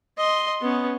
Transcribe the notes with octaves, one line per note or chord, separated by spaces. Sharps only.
D#5 C6
B3 C#4